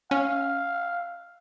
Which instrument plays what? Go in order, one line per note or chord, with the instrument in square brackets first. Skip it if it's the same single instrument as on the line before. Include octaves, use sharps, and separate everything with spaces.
[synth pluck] C#4 [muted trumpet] F5